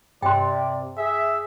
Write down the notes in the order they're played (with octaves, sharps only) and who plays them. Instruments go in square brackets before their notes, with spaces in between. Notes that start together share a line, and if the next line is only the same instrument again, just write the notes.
[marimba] G2 F#6 [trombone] C3 [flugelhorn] D5 [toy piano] G5 C6
[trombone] G#4 [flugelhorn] E5